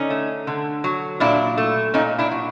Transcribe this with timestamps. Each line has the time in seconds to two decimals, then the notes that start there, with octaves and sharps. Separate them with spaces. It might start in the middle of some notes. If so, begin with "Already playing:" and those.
Already playing: D3 C#4 D#4
0.10 A3
0.47 D3
0.84 F#3
1.20 A#2 D4 E4
1.57 A3
1.94 A#2 C#4 D#4
2.18 D4 E4
2.31 F#3